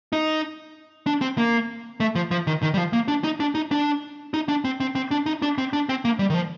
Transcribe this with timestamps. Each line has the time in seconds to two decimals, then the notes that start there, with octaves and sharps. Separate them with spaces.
0.13 D#4
1.07 D4
1.22 C4
1.38 A#3
2.00 A3
2.15 F3
2.31 F3
2.47 D#3
2.63 D#3
2.74 G3
2.78 F3
2.93 A#3
3.08 D4
3.24 D#4
3.40 D4
3.55 D#4
3.71 D4
4.34 D#4
4.49 D4
4.65 C4
4.80 C4
4.95 C4
5.11 D4
5.26 D#4
5.42 D4
5.58 C4
5.73 D4
5.89 C4
6.05 A#3
6.19 G3
6.30 D#3
6.35 F3